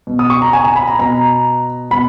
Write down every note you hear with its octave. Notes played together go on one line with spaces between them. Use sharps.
B2
D#6
C#6
A#5
G#5
G#5
B5
A#5
B2 A#5
B2 B5